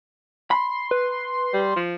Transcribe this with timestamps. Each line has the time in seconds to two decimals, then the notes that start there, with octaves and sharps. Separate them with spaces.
0.51 B5 C6
0.91 B4
1.53 G3
1.76 F3